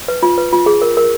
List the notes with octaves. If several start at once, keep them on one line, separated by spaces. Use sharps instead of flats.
B4
F4
B4
F4
G#4
A#4
A#4